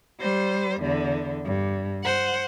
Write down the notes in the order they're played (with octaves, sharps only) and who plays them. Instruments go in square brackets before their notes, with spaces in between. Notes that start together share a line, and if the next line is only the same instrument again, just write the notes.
[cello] G3 C5
E2 D3
G2
C5 F#5